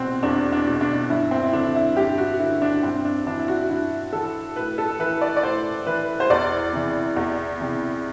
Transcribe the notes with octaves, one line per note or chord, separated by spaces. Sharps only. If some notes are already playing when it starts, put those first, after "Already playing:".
Already playing: E2 B2 C4 F#4
E2 D4
D4
B2
D4
G2 E4
C4
E4
D3 D4
E4
G2 G4
F#4
D3 E4
D4
G2 C4
D4
E3 D4
E4
F#4
G2 E4
E3 A4
A2 B4
A4
E3 B4
D5
D5
A2 C5
E3 B4
C5
E2 D5
C3 E3
E2
C3 E3